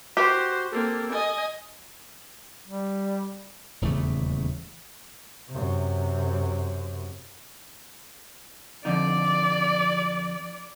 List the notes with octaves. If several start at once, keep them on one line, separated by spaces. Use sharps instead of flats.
F#4 G4 C5
A#3 C4 A4
D#5 G#5
G3
D#1 E2 C#3 A3
F#2 C3
F2 D3 D#4 D5